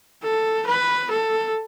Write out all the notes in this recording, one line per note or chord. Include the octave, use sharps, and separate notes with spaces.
A4
B4
A4